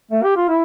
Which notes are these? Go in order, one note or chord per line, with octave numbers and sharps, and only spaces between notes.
A3
G4
F4
E4